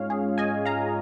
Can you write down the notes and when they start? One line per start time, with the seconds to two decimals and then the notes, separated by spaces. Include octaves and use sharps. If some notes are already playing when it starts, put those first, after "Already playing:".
Already playing: G#2 G#3 C#4 F4 C#5 F5
0.10 G#4
0.38 D#5 G#5
0.65 F5 A#5